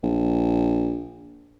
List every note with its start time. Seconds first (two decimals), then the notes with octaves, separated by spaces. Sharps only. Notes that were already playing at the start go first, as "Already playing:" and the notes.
0.03 A#1